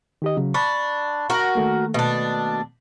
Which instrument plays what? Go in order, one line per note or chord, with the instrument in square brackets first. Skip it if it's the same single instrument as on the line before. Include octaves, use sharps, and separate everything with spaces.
[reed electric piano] D#3 G4 D#5
C#3 F#3
[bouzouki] D4 [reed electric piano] B5 C#6
[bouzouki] F#4 A#4
[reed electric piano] D#3 A3 A#3
[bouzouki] B2 D4